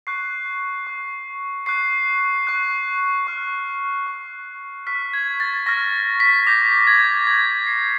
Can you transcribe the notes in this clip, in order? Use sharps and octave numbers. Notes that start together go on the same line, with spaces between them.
C#6 F#6 C7
C#6 F#6
C#6 F#6 C7
C#6 F#6
C#6 F6
C#6 F6
C#6 F6 B6
G#6
A6
C#6 F6 A#6
B6
D6 G6 A#6
G#6
D6 G6 G#6
C7